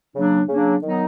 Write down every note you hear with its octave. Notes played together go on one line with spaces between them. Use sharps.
C#3 F#3 A#3 D4
C#3 F#3 A#3 D4
D#3 F#3 B3 D#4